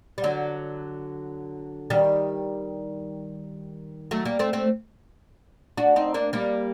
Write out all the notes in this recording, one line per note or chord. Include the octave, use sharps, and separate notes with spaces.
G3
D3 F#3
D#3 G3
F#3 A3
G3 A#3
A3 C4
A3 C4
D4 F#4
C4 D#4
A#3 D4
G3 A#3